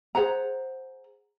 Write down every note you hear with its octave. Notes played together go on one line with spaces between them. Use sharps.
G#4 C5 F#5 A#5